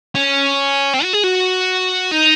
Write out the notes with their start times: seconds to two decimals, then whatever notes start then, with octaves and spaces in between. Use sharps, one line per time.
0.15 C#4
0.94 C4
1.03 F#4
1.13 G#4
1.24 F#4
2.11 D#4